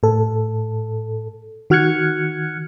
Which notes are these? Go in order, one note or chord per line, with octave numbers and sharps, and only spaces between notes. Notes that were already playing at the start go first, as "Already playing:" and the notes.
A2 A4
D#3 F#4 F6 F#6 G#6 C#7